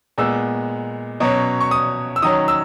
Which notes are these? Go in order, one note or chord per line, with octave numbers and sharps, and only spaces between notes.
A#2 G#3 B3 E6
B2 F#3 C#4
C#6
D#6
E6
D#3 F#3 C#4 D#6
E6